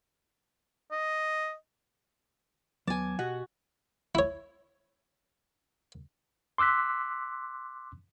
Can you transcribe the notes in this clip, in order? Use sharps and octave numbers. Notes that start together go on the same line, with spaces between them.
D#5
D#2 F#3 B3 G#5 A5 D6
B2 F#4 G4 D#5 F#5
E4 C#5
C6 D6 E6 F#6 B6